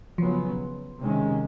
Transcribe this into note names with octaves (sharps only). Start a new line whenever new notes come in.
C#3 F3 F#3 B3
C3 D#3 G#3 C#4